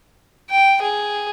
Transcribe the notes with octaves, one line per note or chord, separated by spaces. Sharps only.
G5
G#4